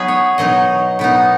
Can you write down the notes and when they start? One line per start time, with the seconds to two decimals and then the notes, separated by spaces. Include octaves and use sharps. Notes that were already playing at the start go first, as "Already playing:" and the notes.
Already playing: F#3 B3 D#4 G#4 B4
0.08 C#5
0.38 B2 F#3 D#4 D#5
0.99 B2 B3 D#4